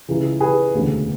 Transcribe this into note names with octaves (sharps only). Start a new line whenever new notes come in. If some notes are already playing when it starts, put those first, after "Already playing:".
C#2 C#3 E3
G#4 B4
E1 D2 C#3